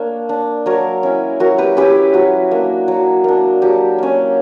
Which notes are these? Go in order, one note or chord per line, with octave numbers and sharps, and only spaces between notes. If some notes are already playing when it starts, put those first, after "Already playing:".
Already playing: A#3 D4 C#5
D4
F#3 A#4 C#5
C#4 E4
F#3 F#4 A#4
G4 B4
C#4 E4 G4 B4
F#3 F#4
A#3 D4
F#3
A#3 D4
F#3 G4
A#3 C#4